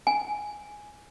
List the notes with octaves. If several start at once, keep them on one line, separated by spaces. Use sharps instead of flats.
G#5